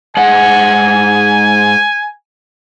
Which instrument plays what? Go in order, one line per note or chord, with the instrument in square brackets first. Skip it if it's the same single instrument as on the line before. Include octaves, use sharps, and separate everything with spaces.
[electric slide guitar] G#2 G#4 F#5 [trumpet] G#5